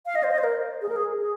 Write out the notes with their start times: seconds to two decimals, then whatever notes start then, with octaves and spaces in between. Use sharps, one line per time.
0.06 F5
0.15 D#5
0.23 C5
0.32 D#5
0.38 C5
0.44 A#4
0.82 G#4
0.89 A#4
0.96 G#4
1.19 G#4